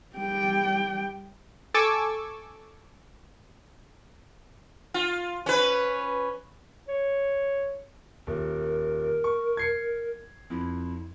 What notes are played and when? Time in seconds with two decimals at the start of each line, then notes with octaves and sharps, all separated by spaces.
0.16 G3 G5
1.74 A4 G#5 C#6 D6 E6
4.94 F4
5.46 C#4 B4
6.89 C#5
8.27 D#1 A#4
9.24 C#6
9.57 G#6 C7 C#7
10.50 F2 E4